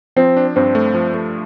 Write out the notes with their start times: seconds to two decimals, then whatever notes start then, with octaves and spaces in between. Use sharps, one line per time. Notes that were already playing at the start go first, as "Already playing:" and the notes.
0.16 F3 C4
0.37 D4
0.56 G2 C4
0.75 A3
0.94 F3
1.14 A3